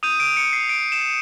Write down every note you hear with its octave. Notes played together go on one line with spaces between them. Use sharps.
D#6 G6 D#7
D7
C#7
C7
D7
E7